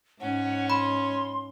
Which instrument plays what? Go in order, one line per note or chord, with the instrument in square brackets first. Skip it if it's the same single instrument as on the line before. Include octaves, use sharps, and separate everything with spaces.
[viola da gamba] G#2 [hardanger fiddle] C#4 C#5 [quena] F#5
[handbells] B5 [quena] C6